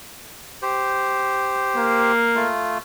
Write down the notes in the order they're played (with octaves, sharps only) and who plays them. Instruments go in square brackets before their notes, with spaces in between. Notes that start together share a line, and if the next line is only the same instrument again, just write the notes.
[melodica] G4 C5
[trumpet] A#3
[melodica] A3 F4